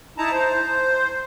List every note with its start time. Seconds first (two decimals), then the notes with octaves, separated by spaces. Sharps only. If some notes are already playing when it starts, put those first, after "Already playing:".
0.18 D#4 E4 A5 A#5
0.32 C5